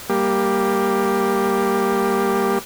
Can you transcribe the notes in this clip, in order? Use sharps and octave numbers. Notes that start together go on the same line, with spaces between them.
G3 A#3 G4